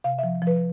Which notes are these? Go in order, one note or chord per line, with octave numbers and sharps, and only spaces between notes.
C3 F5
E5
F3
F3 B4